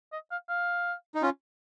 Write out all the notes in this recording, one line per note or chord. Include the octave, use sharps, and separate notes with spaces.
D#5
F5
F5
D#4
C#4 F4